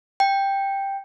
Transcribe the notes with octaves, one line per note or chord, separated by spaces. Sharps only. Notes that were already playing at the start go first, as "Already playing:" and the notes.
G5